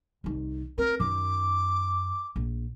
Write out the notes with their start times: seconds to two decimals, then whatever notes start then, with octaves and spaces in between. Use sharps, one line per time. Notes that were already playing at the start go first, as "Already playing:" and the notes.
0.24 C2 D#3
0.78 C4 A#4
1.00 F#2 D#3 D6
2.36 A#1